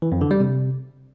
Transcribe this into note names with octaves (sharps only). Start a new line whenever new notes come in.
E3
F2
D3
G3
C3